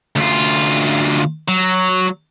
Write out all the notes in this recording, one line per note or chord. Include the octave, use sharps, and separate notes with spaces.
D2 F4
F#3